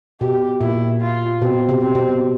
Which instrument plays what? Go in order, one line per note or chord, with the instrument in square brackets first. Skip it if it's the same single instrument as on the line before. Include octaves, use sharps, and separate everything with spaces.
[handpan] B2 [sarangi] G4
[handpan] A#2 [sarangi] E4
[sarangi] F4
[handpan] B2 [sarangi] C4
[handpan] C3
[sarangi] C4
[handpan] B2